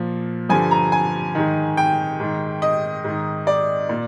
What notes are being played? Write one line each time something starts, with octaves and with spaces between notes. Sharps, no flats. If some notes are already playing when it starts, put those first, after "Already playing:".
Already playing: A#2 F3
G2 D3 F3 G#5
A#5
G#5
G#2 D#3
G5
G#2 D#3
D#5
G#2 D#3
D5
A#2